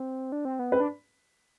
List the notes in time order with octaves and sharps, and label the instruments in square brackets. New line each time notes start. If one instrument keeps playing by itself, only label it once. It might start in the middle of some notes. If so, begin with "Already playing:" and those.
Already playing: [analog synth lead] C4
D4
C4
B3
[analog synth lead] C4 [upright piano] B4
[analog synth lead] D4